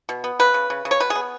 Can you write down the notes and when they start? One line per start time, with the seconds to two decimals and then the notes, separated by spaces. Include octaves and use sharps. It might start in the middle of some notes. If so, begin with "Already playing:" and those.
0.09 B2
0.24 B3
0.39 C#3 B4
0.54 C#3
0.70 C#3
0.85 C#3
0.91 C#5
1.00 B2 B4
1.10 G#4
1.15 B3